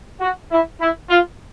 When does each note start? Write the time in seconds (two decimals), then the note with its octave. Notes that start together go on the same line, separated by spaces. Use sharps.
0.20 F#4
0.51 E4
0.81 E4
1.10 F4